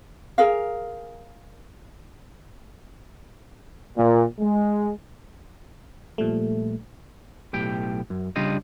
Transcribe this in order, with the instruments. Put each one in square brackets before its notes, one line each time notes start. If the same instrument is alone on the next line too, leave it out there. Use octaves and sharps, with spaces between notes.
[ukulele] G#4 A#4 F5
[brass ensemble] A#2
G#3
[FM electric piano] A#2 F3 G3 A3
[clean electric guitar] B1 A2 G4 G5
F#2
C#3 G3 D4 F4 G4 D#5